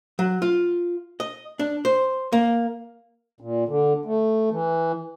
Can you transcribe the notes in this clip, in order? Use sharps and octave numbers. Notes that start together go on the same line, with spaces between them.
F#3
F4
D#5
D4
C5
A#3
A#2
D3
A3
E3